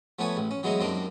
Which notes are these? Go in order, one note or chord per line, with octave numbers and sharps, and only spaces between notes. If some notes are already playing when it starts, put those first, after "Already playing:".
F3 A3 B3 B4 C#5 G#5
A1
C#4
E3 F#3 G#3 B3 D#4 E4
F#2 G3 A#3 C4 D4 D#4